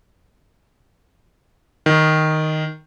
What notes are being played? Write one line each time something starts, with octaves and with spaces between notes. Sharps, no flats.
D#3